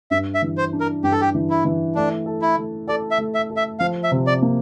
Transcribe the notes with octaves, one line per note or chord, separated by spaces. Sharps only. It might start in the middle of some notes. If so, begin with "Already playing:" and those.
G2 E5
E5
E3
C5
D4
A#4
G2 G4
A4
G4
E3
E4
E3
A3 D4
A4
E4
A3
A4 D5
E5
A3
E5
A4
E5
F3 F5
E5
C3
D5
A#3